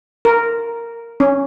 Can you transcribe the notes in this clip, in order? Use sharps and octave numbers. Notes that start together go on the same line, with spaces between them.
A#4
C#4